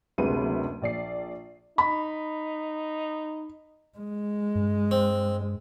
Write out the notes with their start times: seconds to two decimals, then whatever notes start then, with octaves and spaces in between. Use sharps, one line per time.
0.18 F#1 D2 C3 G#3 B4 D#7
0.82 A#1 D5 C7
1.78 D#4 B5
3.98 G#3
4.55 G2
4.91 C4